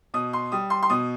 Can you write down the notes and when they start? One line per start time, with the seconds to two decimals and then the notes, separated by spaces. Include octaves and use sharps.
0.14 B2 D#6
0.33 C6
0.52 G3 D#6
0.70 C6
0.83 C6
0.90 B2 D#6